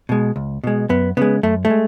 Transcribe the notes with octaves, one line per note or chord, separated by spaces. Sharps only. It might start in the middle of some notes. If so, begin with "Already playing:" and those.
B2 G#3
C#2
B2 G#3
F#2 B3
C#3 G#3 B3
F#2 A3
A3
G#3